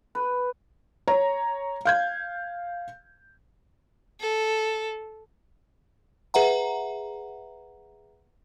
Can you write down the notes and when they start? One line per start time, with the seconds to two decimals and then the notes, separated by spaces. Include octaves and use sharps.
0.15 B4
1.08 C#5 A#5
1.85 F5 G6 G#6
4.20 A4
6.34 G#4 B4 E5 F#5 A#5